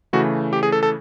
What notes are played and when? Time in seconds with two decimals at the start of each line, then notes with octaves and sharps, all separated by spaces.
0.13 C#3 E3 A3 F#4
0.53 G4
0.63 G#4
0.72 A4
0.83 A4